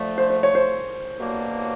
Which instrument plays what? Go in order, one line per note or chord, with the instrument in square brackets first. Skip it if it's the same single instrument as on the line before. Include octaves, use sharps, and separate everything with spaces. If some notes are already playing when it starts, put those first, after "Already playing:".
Already playing: [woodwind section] D3 F3 A3
[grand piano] C5
C5
C#5
C5
[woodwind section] C2 B2 F#3 A#3 D4